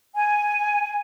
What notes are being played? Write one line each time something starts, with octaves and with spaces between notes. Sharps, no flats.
G#5